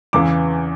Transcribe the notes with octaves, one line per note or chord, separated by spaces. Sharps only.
E2 C#3 E3 D6